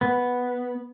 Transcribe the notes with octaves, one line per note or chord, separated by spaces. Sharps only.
B3